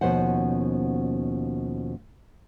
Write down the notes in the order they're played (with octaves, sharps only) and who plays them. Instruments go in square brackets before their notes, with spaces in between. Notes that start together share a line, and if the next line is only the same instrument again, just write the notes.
[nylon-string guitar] D#2 B2 F3 C#4 C5 F#5